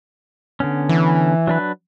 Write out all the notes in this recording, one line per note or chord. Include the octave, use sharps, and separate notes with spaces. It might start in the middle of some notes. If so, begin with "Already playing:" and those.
D3 B3 C#4
E3
F#3 D4 B4